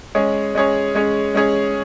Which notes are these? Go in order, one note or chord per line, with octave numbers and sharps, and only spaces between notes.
G#3 C#4 G#4 C#5
G#3 C#4 G#4 C#5
G#3 C#4 G#4 C#5
G#3 C#4 G#4 C#5